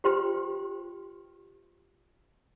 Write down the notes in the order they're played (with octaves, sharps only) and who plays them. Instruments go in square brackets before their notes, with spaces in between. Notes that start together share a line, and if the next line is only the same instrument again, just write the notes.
[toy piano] F4 G4 B4 C5 G5 C6